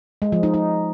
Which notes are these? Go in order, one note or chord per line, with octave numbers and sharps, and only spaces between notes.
G#3
F3
D#4
D#4